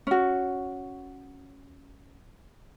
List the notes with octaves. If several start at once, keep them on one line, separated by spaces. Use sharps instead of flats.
C#4 F#4